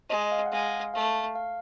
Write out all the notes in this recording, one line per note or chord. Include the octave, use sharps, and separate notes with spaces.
G#3 D#5
F5
F#5
G#3 F5
A3 F5
F5